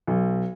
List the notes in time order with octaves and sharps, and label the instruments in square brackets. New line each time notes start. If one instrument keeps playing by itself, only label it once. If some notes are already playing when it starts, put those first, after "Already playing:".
[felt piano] B1